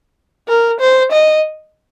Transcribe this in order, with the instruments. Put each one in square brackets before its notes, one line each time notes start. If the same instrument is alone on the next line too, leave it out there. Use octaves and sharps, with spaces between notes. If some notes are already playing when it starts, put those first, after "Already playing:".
[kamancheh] A#4
C5
D#5